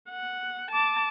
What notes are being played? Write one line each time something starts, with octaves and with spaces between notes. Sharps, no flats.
F#5
A5 D6